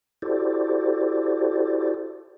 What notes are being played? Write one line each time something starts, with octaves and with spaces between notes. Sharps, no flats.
E4 F#4 G4 A4 C5 D5